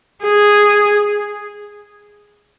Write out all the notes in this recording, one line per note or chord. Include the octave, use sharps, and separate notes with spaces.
G#4